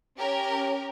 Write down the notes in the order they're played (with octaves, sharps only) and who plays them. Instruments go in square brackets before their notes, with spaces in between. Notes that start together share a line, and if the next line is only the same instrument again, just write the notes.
[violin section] C#4 G4 A#4